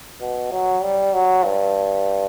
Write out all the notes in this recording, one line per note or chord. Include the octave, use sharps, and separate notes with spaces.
B2
F#3
G3
F#3
G2